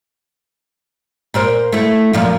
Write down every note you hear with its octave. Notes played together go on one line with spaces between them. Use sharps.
A#2 A#4 C5
A3 E4
F#2 A#2 F3